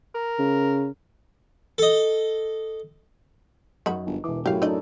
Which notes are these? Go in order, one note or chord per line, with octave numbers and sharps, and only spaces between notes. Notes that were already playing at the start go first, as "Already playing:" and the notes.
A#4
C#3
A4 D#5
F#2 D#3 F#4 B5
G1
E1 E3 D6
F#2 A2 F#3 E4 G4 C#5 F5
A3 D4 D#4 A4 D5 D#5